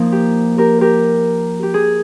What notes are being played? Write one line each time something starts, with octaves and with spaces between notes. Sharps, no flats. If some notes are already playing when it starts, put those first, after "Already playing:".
Already playing: F3 A#3 D#4
G4
G4 A#4
G4 A#4
G4
G#4